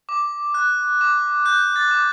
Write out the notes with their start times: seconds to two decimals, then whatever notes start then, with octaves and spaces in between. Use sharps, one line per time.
0.09 D6
0.54 F#6
1.01 D6
1.46 F#6 G6
1.76 A6
1.91 D6